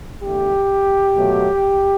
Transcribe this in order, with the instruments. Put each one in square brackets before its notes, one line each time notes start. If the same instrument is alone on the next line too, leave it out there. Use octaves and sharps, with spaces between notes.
[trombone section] E2 D3 A3 G4
B2 F#3 A3